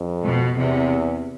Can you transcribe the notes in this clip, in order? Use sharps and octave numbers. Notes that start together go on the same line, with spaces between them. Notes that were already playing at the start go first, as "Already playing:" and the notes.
Already playing: F2
B2
E2 C3